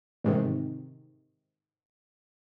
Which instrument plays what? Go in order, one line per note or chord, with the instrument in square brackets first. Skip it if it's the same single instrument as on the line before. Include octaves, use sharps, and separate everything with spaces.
[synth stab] A1 G#2 C3 D#3